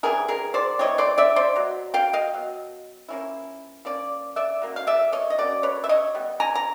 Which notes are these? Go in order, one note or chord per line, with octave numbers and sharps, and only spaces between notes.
E3 G3 C4 E4 G#4 A#4
G#4 A#4
C5 D5
E3 G3 C4 E4 C#5 D#5
C5 D5
D5 E5
C5 D5
B2 F#3
F5 G5
D#5 F5
B2 F#3
F3 A#3 C#4 E4
F3 A#3 C#4 D5
D5 E5
F#3 A#3 C#4
F5
D5 E5
C#5 D#5
D#5
F#3 A#3 C#4 D5
B4 C#5
E5
C#5 D#5
G3 B3
G#5 A#5
A#5